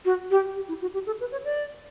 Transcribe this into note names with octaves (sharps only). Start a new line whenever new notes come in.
F#4
G4
G4
E4
F#4
G4
A4
B4
C#5
D5